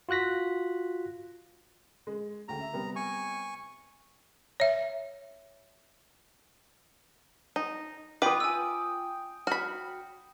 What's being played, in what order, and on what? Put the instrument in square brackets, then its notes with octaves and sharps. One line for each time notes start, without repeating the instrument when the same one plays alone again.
[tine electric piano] F4 F#4 F#6 A#6 B6
[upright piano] G#3
[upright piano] D2 C#3 G5 [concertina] A#5
[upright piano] E5
C3 G3 B3
[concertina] G#5 C#6
[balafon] C#5 E5
[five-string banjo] D#4
[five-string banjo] F4 B4 [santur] G5 D#6 [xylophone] B5 D6
[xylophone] G#5 E6
[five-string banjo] F#4 B5 [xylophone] F6